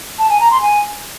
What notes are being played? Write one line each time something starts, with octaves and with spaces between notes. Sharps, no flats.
A5
G#5
A#5
C6
G#5